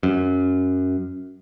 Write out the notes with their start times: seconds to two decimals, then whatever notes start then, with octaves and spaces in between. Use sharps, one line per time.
0.03 F#2